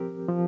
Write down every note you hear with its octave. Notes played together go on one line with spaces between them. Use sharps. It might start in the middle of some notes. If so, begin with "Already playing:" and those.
Already playing: F3 C4 G4 A#4
F3